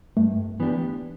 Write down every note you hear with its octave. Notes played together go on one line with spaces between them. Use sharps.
G2 A3
E3 B3 D4 G4